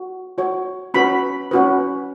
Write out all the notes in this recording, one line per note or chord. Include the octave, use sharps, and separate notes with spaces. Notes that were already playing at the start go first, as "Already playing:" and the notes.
Already playing: F#4
F#4 C#5
C#4 F#4 B4 B5
C#4 F#4 B4